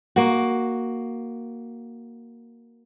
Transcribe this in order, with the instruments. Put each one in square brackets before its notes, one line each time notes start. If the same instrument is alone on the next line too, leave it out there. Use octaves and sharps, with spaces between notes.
[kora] A#3 F#4